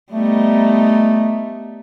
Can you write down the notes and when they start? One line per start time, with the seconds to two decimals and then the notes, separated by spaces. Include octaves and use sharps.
0.12 G3 A3 B3 D#4